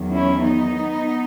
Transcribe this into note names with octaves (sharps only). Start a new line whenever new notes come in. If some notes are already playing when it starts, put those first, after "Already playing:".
Already playing: E2 D#3 F#3
C#4 E4
B3 D#4